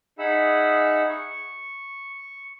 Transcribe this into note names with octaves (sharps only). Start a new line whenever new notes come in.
D#4 G#4 E5 F#5 B5 E6
C#6